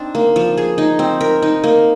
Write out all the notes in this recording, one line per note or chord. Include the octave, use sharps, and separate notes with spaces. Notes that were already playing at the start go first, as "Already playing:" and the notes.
Already playing: C4 D4 D#4
A#3
F3
G#4
D#4
C4
A#4
D#4
A#3